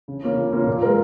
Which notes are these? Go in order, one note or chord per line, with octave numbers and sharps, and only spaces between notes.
C#3
A#3 C#4 F4
C#3
A#3 C#4 F4
A#2
G#3 F4 A#4